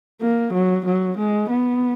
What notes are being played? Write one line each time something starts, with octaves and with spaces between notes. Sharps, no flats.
A#3
F#3
F#3
G#3
B3